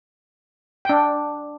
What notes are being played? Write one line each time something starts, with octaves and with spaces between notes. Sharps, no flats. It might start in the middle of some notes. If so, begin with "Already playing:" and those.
D4 G5